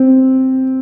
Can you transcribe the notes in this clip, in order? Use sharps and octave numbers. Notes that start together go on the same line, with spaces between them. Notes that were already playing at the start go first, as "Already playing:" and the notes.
Already playing: C4